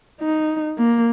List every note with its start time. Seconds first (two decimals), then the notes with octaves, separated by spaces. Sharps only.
0.21 D#4
0.78 A#3